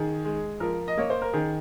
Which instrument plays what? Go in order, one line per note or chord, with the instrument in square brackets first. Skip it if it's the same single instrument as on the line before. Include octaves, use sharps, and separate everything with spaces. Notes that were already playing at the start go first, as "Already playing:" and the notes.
Already playing: [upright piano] D#3 [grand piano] G#4
[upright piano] G#3
[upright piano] F3 [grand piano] A#4
[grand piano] D#5
[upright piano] A#3 [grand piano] C#5
[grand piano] C5
A#4
[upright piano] D#3 [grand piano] G#4